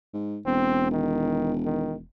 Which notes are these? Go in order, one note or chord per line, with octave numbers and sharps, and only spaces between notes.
G#2
E1 C4
D#3
D#3